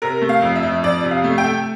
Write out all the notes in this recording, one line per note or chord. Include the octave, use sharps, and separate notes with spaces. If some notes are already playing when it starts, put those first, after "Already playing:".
C3 A#4
A3
F5
F2
E5
F2
F2 D5
C3
F5
A3
G5
A3